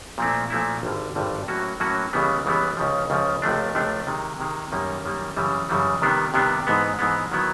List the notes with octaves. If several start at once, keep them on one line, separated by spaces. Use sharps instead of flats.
A#2 F3 A3 C4 E4
A#2 F3 A3 C4 E4
G#1 G2 D3 G3
G#1 G2 D3 G3
A2 F#3 A#3 C#4 F#4
A2 F#3 A#3 C#4 F#4
C#2 C#3 E3 G3 B3
C#2 C#3 E3 G3 B3
C#2 C#3 F3
C#2 C#3 F3
C#2 C3 F3 A3 D4
C#2 C3 F3 A3 D4
C3 D#3 G#3
C3 D#3 G#3
F#2 D#3 G3 A#3
F#2 D#3 G3 A#3
F#2 C#3 E3 G3
F#2 C#3 E3 G3
C3 D#3 G3 B3 D4
C3 D#3 G3 B3 D4
G#2 E3 G#3 B3
G#2 E3 G#3 B3
D#3 F#3 B3 E4